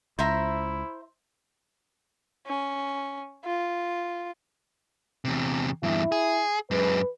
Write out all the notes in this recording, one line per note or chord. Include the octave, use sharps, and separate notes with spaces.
C#2 E4 C5 E5 A#5
C#4
F4
E2 C3
E2 G2 E4
G#4
F#2 G#3 B4